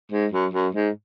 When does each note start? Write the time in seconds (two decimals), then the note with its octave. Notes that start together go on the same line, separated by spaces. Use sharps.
0.12 G#2
0.32 F#2
0.53 F#2
0.75 G#2